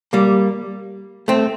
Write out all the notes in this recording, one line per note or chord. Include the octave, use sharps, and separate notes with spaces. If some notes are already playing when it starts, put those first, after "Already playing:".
G3 A#3
A3 C4